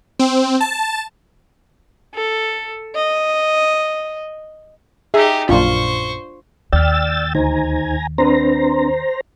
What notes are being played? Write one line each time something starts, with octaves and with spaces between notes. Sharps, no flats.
C4
A5
A4
D#5
D#4 G4 G#4 E5
A#1 F#2 A#2 D4 F4 C5 C#6
D#2 D5 G5 E6 F6 A6
D2 D#4 C5 G#5 A#5
C4 D4 B4 C5 A#5